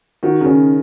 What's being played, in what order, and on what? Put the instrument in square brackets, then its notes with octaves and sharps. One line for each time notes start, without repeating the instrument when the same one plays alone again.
[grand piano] D#3 [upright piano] F#4
[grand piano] C#3
[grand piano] D#3 [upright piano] C#4